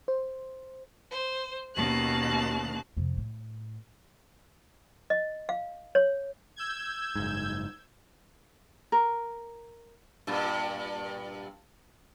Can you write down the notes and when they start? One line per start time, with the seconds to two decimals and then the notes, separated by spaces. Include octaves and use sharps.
0.08 C5
1.11 C5
1.75 D#2 B2 A#3 C#4 A5 F#6
2.97 F2 C3
3.17 A2
5.10 D#5
5.49 F5
5.95 C#5
6.56 E6 G6 G#6
7.15 F#1 G#2
8.92 A#4
10.27 G2 A#2